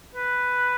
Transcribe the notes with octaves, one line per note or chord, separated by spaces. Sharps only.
B4